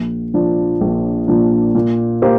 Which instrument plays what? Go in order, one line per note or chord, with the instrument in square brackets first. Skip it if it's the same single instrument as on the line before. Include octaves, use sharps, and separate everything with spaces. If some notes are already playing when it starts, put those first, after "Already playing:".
Already playing: [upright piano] A#1
A#2 F3 D4
A#1
A#2 F3 D4
A#2
A#3 G4 C5